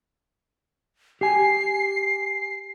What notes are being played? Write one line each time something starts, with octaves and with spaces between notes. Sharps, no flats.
G4 G#5 C7